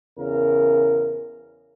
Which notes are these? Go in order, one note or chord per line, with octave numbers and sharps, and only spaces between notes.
E2 C#3 A#4